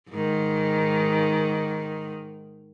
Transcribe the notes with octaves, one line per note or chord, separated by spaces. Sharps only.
G#2 D#3